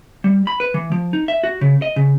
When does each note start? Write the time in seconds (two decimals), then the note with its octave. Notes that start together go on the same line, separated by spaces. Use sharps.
0.24 G3
0.47 B5
0.60 B4
0.74 E3
0.92 F3
1.13 D#4
1.28 E5
1.43 F#4
1.61 C#3
1.82 D#5
1.96 C#3